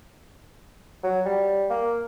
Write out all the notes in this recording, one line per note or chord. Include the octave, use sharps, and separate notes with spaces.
F#3
G3
A#3